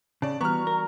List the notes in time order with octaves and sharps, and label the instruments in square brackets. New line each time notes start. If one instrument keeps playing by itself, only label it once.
[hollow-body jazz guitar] C#3 [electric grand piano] D5 A5
[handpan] E3 G3 F#4 [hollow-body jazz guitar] B3 [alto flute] A#5 [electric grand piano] C#6 F6
[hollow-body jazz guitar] A#4